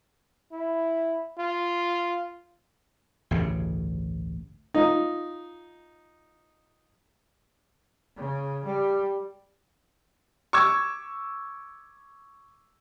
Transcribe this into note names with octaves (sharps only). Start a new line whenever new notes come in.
E4
F4
A1 D2 G2 C#3
D#4 F4
C#3
G3
C#6 D6 E6 G#6